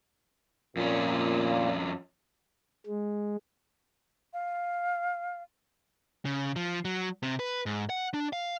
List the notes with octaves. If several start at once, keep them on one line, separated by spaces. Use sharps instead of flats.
F2 A#2 C#4
G#3
F5
C#3
F3
F#3
C3
B4
G#2
F#5
D4
F5